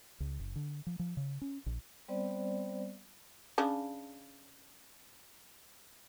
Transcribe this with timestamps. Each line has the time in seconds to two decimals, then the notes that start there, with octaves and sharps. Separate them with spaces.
0.20 C#2
0.40 F#1
0.56 D3
0.87 F3
0.99 F3
1.17 C#3
1.41 C#4
1.66 A#1
2.08 G3 B3 C4 C5 D5
3.58 C#3 D4